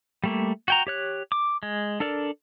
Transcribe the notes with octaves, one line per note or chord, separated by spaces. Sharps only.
G3 A3 A#3
F#4 G5 A#5
G4 C#5 F#6
D6
G#3
D4 A4 A#4 D5